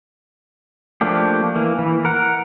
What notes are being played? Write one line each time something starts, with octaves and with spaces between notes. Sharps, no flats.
F3 A3 A#3 D4 G4
E3 A#3
E3
A#4 F#5